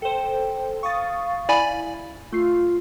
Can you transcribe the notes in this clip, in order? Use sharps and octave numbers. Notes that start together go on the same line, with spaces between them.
A4 C5 G5
F5 C#6 D#6 A6
E4 D5 G#5 B5
A3 F4 C7